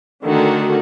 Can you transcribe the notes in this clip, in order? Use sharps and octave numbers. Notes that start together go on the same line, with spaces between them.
D3 D#3 A3 F#4